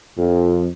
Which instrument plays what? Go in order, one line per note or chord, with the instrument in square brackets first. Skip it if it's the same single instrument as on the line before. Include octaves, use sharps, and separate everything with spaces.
[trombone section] F2